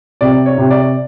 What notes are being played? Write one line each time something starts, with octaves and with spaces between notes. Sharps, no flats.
C3 D5
C#5
C3
D5